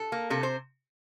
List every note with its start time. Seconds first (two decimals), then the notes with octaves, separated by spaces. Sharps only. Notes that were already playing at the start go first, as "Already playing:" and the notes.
Already playing: A4
0.12 A#3
0.30 C3 A4
0.43 C5